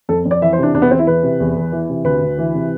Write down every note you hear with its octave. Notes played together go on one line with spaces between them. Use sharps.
F2 A4
F2
D5
E3 E5
C5
C3 D4
E2 D4
B3
E2 C4
E4
E3 B4
C3
E2
E2
E3
C3
D2 B4
D2
E3
C3